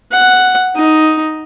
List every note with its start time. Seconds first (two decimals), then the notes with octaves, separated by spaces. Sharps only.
0.12 F#5
0.76 D#4